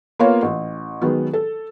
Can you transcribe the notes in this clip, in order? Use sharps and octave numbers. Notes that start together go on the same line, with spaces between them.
A#3 B3 F4 A#4 C#5 F5
A1
D#3 F#3 G#3 B3
A4